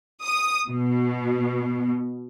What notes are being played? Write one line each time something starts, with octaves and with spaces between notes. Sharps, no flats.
D#6
B2